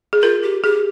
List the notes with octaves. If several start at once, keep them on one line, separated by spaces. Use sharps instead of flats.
G#4
F4 A#4
G4
G4 G#4